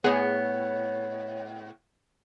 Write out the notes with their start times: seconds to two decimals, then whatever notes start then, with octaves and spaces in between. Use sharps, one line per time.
0.04 A2 B3 G#4 C#5 F#5